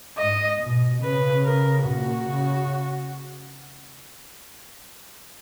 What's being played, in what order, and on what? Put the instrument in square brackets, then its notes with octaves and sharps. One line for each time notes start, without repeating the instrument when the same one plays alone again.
[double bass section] G#2 [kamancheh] D#5
[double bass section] B2
[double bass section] C#3 [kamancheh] B4
[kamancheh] A#4
[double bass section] A#2 [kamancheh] F#4
[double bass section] C#3